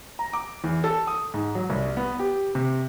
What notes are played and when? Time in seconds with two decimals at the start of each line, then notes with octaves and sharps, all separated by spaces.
0.19 A#5
0.33 D6
0.64 E2
0.84 A4
1.07 D#6
1.34 G#2
1.55 F#3
1.70 C2
1.97 B3
2.19 G4
2.55 C3